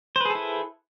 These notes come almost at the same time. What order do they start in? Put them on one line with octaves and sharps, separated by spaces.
C5 B4 G#4 A4 E4